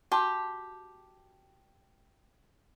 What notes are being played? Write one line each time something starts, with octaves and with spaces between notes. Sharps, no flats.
F#4 G4 A5